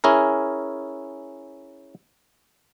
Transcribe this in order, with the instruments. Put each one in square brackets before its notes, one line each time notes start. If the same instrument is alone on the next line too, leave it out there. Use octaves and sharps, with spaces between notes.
[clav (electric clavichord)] C#4 E4 G#4 A#4